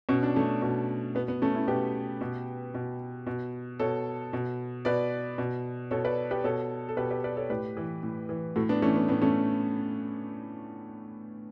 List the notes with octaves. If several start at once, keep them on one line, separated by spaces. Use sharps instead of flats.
B2 C#4
D4
A3 C#4
B2
B2 B3
B3
A3 C#4
C#4 E4
B2 G4 B4
B2
B2
B2
B2 A4 C#5
B2
B2 B4 D5
B2
B2 A4 C#5
B4 D5
G4 B4
B2 A4 C#5
A4
B2 G4 B4
G4 B4
B4 D5
A4 C#5
A2 G4 B4
E3
A2
E3
A2 F#4 A4
B3 D4
E3 A3 C#4
B3
A2 B3
A3 C#4